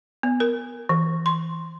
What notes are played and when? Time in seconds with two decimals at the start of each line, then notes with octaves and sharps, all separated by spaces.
0.23 B3
0.40 A#4
0.89 E3
1.26 C6